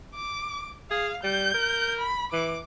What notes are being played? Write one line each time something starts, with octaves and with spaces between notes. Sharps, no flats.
D6
G#4 F5
G3 G6
A#4
B5
E3 D6